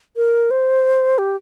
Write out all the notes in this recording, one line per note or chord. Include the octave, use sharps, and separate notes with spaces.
A#4
C5
G4